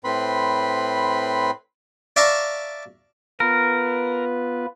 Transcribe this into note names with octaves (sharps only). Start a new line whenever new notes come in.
A2 C4 B4 B5 C6
D5 E5 F5 A5 A#5 C#6
B3 F4 A#4 B4